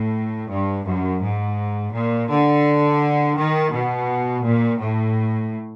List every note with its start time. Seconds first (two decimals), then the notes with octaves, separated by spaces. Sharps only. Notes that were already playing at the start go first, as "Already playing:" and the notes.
Already playing: A2
0.49 G2
0.86 F#2
1.22 G#2
1.93 A#2
2.29 D3
3.37 D#3
3.72 B2
4.44 A#2
4.79 A2